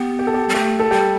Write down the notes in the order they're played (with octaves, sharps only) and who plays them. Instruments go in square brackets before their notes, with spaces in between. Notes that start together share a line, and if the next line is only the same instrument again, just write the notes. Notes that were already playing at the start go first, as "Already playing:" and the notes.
Already playing: [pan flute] B3 [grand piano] G4
[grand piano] G4
A4
G4
[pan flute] G3
[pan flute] A3 [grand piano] G4
[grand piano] A4
[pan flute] G3 [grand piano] G4